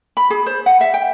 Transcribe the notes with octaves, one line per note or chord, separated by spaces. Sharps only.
B5
G#4
C5
F#5
E5
G5